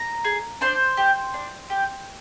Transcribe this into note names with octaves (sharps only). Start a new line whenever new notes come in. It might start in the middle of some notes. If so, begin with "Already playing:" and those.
Already playing: A#5
G#4
D4 C5
G4
D4
G4